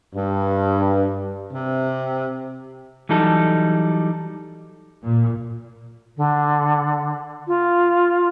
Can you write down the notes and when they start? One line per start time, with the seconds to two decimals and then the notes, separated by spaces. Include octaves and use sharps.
0.15 G2
1.52 C3
3.09 E3 F#3 G3 D#4 A4
5.03 A#2
6.16 D3
7.47 F4